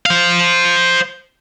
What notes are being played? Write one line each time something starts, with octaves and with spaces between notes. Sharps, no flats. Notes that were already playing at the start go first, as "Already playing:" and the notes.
C5 F5